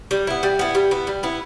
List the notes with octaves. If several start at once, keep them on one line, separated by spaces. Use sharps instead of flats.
G3
B3 E4
G3
B3 E4
G3
B3 E4
G3
B3 E4